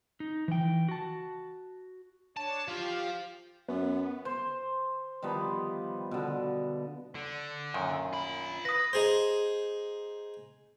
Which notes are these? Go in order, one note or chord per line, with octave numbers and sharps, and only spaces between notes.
D#4
E3 G5
F#4 A5
D4 C#5 A5
F3 F4 G4 F5
F#2 B3
C5
D#3 F3 G3 B3
B2 D3
D3
F#2 A#2 D#3
F4 B5
B4 D#6 A#6
D#4 G#4 C5